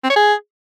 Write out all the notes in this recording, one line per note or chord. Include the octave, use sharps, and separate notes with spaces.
C4
C#5
G#4